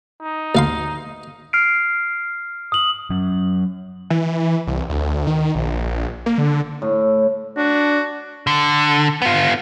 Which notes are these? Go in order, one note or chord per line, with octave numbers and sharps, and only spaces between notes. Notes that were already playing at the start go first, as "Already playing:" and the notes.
D#4
D2 F5 C6
F6 C7 D7
D#6 F#7
F#3 C#4
E3
C2
D2
D#3
A#1
A#3
D3
A2
D4 F#4
D3
B3 F4